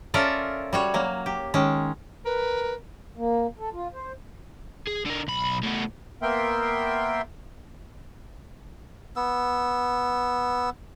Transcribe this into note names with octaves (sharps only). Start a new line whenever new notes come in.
C#4 F4 A4 A#4 D5 E5
G3 F#4 C#5
F#3 A#3
G4
D#3 G#3 C#4
A#4 B4
A#3
A4
F4
C5
G#4
D3 A#4
B1 B5
A2 B3
A#3 B3 A#4 E5 G5 C6
B3 E6